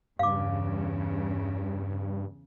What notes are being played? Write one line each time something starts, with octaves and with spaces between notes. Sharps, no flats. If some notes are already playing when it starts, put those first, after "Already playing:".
E2 G2 C#3 F5 D6